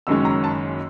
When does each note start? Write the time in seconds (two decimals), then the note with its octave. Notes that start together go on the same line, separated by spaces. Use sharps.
0.07 F#1 F#2 D#3 G#3 C#4 E6
0.25 A#5
0.44 A5